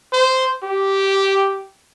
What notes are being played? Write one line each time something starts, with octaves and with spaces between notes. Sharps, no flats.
C5
G4